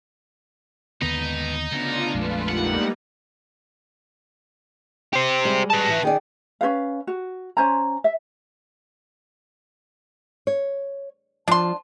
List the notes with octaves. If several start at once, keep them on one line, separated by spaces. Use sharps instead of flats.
D#2 G#2 D3 B3 D#4 B4
D2 C#3 B3 D4 F4
A#1 F2 G#3 A3 F4 B4
G3 A#3 D#4 F#5
G4 C5
G3 G#3
B4 A5
E3
D#3 G#4 D5
C#4 F4 B4 F5
F#4
C#4 C5 G#5 A#5
E5
C#5
F3 D4 F4 C6